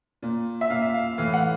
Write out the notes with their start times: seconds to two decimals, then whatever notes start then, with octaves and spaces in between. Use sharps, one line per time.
0.22 A#2
0.61 E5
0.70 A#2 F5
0.82 E5
0.94 F5
1.18 A2 E3 F5
1.34 F#5